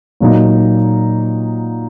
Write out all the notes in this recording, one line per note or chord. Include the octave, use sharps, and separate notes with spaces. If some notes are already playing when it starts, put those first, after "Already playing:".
A#2 F#3 A#3 D#4